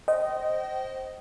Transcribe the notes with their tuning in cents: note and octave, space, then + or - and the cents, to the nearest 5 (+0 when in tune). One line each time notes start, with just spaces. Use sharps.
C5 +0 D#5 +0 G5 -35